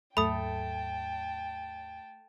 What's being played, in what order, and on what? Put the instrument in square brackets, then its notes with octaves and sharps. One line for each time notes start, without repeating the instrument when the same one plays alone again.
[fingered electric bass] D#2 G#2 F#3 [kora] A3 [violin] G5 A5 [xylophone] B5 D#6